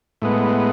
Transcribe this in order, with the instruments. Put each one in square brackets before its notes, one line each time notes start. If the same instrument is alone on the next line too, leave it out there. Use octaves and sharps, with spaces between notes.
[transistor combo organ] A2 G#3 B3